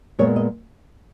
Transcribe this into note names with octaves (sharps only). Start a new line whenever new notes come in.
A#2 G#3 B3 C#5
D#5